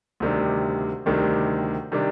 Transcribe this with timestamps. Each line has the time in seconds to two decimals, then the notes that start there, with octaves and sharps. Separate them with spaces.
0.20 D2 C3 D#3 G3 D4
1.06 D2 C3 D#3 G3 D4
1.92 C3 D#3 G3 D4